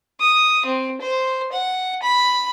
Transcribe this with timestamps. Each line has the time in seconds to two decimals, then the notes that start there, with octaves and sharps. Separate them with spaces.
0.20 D#6
0.65 C4
1.01 C5
1.52 F#5
2.02 B5